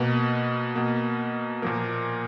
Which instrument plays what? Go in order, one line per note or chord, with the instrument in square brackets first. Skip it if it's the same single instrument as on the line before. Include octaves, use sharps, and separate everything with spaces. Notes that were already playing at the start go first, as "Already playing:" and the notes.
Already playing: [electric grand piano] B2 A#3 B4
B2 A#3
A#2 F3 A#3 A#4